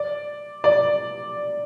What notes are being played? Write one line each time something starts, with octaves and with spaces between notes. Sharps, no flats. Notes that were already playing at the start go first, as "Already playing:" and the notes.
Already playing: D5
D5